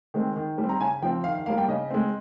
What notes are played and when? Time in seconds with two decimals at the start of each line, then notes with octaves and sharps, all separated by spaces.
0.14 D#3 G#3 C4
0.36 D#3
0.58 G3
0.63 C4
0.69 A#5
0.81 C#3 G#5
1.02 F3 G5
1.05 C4
1.24 D#3 F5
1.35 F5
1.46 G3 A#3 F5
1.58 G5
1.68 C#3 D#5
1.90 G#3 C4